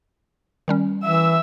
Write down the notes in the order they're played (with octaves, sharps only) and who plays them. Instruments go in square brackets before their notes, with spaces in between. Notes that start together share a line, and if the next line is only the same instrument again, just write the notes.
[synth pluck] D#3 G3 C#4
[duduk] E3 [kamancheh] E5 E6